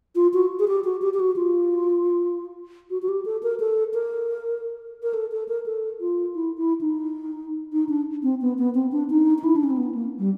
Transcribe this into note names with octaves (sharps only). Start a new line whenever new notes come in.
F4
F#4
G#4
G4
F#4
G4
G4
F#4
F4
F#4
F#4
G4
A4
A#4
A4
A#4
A#4
A4
A4
A#4
A4
F4
E4
E4
D#4
D#4
D4
C4
B3
B3
C4
D4
D#4
D#4
E4
D4
C#4
C4
B3
A#3
G3